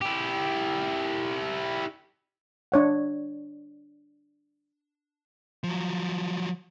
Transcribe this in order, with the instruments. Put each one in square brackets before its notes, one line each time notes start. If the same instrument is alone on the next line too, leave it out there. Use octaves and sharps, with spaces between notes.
[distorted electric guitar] E4 G4
[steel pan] D4 C#5 F#5
[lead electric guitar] F3 F#3